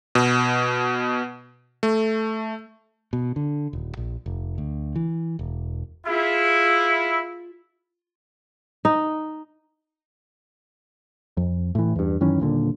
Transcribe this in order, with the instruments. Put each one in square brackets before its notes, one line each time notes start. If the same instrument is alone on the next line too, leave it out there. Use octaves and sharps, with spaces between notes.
[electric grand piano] B2
A3
[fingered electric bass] B2
D3
D#1
A#1
F1
D2
E3
E1
[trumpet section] E4 [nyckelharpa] F4 G#4
[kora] D#4
[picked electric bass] F2
A2 E3
E2 G2
F#2 D#3 E3 C#4
D#1 A#2 D3